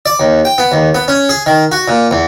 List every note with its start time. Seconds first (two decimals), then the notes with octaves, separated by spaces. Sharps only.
0.06 D5
0.20 D#2
0.45 G5
0.58 B3
0.72 D#2
0.95 B3
1.08 C#4
1.29 G#4
1.46 D#3
1.72 F#4
1.88 A#2
2.11 E2